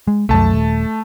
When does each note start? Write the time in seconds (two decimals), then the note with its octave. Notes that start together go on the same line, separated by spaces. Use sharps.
0.08 G#3
0.29 C2 F#2 A3 A5
0.52 D#1